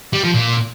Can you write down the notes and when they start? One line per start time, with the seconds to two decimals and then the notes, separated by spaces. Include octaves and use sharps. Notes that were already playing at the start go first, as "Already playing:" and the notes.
0.13 G3
0.24 F3
0.34 A#2